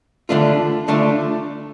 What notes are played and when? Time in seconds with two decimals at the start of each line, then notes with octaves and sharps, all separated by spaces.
0.29 D3 A3 D4 F4
0.88 D3 A3 D4 F4